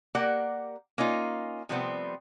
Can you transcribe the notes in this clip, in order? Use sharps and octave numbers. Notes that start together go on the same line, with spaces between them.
A#3 G4 A#4 D5 F#5
A#3 C#4 D#4 F4
C3 F3 G3 A3 B3 C4